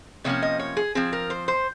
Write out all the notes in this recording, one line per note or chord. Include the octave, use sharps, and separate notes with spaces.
C3 F3 A#3 C#4 C#5
D#5
C#5
G#4
F3 C4 G#4
A#4
C5
C5